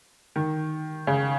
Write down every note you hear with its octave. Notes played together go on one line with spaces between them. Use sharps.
D#3
C#3